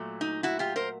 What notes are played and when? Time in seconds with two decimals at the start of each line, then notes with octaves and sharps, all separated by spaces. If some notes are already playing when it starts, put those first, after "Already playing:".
Already playing: A#2 F#3 A3
0.21 D#4
0.43 E4 F#4
0.59 F4 G4
0.76 A#4 C5